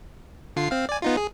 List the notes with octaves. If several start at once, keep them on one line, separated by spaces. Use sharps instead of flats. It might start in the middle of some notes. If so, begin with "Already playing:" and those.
D3 F4 C7
C4 F5
D5 G#5
B3 D#4 F4
G#4